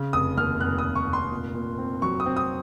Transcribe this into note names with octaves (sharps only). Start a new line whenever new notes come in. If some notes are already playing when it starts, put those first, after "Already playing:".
Already playing: C#3
F1 D#6
D#2 F6
F1 F#6
D#6
F1
C#6
F1
C6
A#2
A#2
C4
F#3 C#6
D#6
C4
D#6